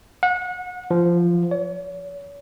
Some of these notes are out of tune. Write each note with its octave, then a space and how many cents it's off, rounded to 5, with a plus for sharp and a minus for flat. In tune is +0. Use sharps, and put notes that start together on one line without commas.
F#5 -30
F3 -10
C#5 +40